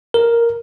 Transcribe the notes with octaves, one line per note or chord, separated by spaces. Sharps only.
A#4